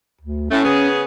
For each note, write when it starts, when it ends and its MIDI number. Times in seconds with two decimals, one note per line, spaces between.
0.21 0.48 38
0.50 0.63 45
0.50 0.63 57
0.50 0.88 61
0.64 1.03 49
0.64 1.03 59
0.64 1.03 68